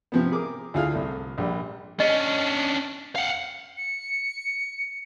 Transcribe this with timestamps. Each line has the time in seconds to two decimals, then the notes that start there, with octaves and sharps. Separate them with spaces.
0.12 C3 F3 B3
0.32 G#4 A#4 D6
0.74 D2 D3 E4 F4 G#4 F5
0.93 C2 A3
1.38 A#1 G3
2.00 C#4 D4 D#5
3.16 F5 F#5
3.77 C#7